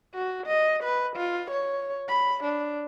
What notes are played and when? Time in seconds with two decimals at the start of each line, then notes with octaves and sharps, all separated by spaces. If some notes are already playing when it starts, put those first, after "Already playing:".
0.15 F#4
0.47 D#5
0.83 B4
1.16 F4
1.51 C#5
2.09 B5
2.44 D4